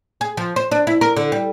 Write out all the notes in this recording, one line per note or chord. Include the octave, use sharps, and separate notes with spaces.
G#4
F3
C5
D4
E4
A#4
D3
G3